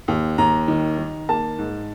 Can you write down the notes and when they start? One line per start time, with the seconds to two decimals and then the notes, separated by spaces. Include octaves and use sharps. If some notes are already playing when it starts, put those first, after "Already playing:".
0.08 D#2
0.38 D#2 A#5
0.68 D#3
0.98 D#3
1.29 A#3 A5
1.58 G#2